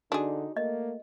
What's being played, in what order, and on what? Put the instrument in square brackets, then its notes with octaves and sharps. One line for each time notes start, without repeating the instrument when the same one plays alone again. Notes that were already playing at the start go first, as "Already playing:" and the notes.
[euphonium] D3 [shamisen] D4 G#4 [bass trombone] D#4 [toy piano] F#4
[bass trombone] A3 [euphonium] A#3 [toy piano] D#5